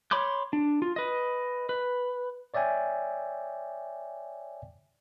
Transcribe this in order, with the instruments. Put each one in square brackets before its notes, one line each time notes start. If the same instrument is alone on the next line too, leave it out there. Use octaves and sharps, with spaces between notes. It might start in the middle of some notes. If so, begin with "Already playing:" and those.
[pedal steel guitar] C#5 B5 C6 D6 G6
D4
F4
B4 D#5
B4
[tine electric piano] C#5 D5 E5 G5 G#5